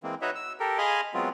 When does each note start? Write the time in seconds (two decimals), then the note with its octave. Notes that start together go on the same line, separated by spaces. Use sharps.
0.03 E3 G#3 A#3 C4
0.22 D#4 F#4 B4 C#5 D#5 E5
0.35 E6
0.60 G4 A4 A#4
0.78 G#4 D#5 F5 G#5 B5 C6
1.14 F#3 G#3 B3 C4 F4